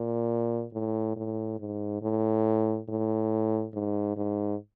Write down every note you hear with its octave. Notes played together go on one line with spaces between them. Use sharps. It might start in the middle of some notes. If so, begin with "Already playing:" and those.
Already playing: A#2
A2
A2
G#2
A2
A2
G#2
G#2